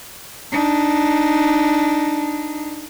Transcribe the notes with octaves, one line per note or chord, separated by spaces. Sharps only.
D4 D#4